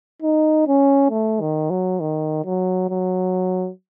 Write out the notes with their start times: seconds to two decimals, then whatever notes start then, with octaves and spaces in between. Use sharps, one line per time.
0.22 D#4
0.67 C#4
1.11 A3
1.41 D#3
1.71 F#3
2.00 D#3
2.45 F#3
2.90 F#3